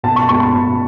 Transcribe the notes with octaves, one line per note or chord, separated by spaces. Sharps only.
B2 A5
C#6
G#3 B3 C#6
B5
B2